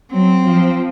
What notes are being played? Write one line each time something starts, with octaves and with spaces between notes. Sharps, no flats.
F#3 C4
F3